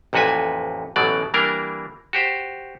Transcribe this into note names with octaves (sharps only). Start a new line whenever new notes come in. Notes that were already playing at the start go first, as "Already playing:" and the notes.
A1 F2 A#2 F#4 B4 G#5
A1 B2 E3 F#3 D5
E3 G3 A#3 D4 A#4
F#4 G4 C5